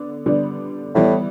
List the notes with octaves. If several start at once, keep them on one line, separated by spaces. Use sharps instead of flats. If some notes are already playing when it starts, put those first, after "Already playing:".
Already playing: D3 B3 D4
D3 G3 B3 D4
A2 E3 G3 B3 E4